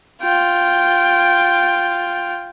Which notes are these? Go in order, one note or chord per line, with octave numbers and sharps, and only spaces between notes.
F4 G5